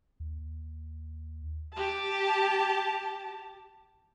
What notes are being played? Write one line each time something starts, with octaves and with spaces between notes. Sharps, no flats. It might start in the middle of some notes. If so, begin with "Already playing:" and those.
D#2
G4 A5